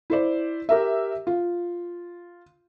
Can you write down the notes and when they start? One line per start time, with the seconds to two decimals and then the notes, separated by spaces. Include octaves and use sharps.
0.10 E4 C5 D5
0.69 G4 A#4 E5
1.27 F4